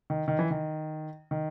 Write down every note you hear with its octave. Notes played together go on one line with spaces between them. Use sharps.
D#3
D#3
E3
D#3
D#3